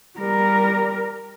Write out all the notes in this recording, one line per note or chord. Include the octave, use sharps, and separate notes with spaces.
G3 A#4